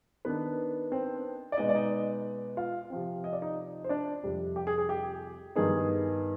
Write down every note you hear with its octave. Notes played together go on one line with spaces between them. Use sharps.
D#3 B3 D4 B4
C4 C5
D5
B2 G#3 B3 D#4 D#5
D5
D#4 D#5
F4 F5
C3 F3 C4
D#5
D5
D#4 D#5
C5
D4 D5
F2 C3 G3
G4
G#4
G#4
G4
G2 D#3 B3 D#4 G#4